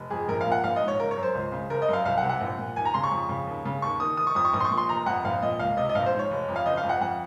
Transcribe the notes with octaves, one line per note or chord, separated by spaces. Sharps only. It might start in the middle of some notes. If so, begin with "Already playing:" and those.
Already playing: F1
F2 G#4
A#1 A#4
F5
A#2
F#5
A#1 F5
D#5
G#2
C#5
F#1 A#4
C#5
F#2
C5
C#2
C#3
F#1 A#4
D#5
F#2 F5
C2 F5
F#5
C3
F#5
A#1
A#2
D#2 G#5
A#5
C#3 C6
C#6
F2
C#3
D#2
C#3
D#2 C#6
D#3 D#6
F1 D#6
C#6
F2 D#6
C#6
A#1 D#6
C6
C#6
A#2
C6
F1 A#5
F2 F#5
A#1 F5
A#2 D#5
C#2 F5
C3 D#5
D#5
A#1 F5
C5
G#2
C#5
F1
F2
F5
F#1 D#5
F5
F2
F#5
F2 F#5